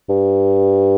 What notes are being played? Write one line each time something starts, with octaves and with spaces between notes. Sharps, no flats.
G2